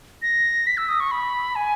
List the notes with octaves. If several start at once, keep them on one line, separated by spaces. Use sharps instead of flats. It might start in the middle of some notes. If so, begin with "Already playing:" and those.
A#6
B6
E6
D#6
C#6
B5
G#5